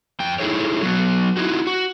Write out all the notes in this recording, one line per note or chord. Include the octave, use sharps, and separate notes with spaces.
F2 G5
D#4 E4 G#4 A4 C#5
F#3 B3
D#4 E4 F#4
F#4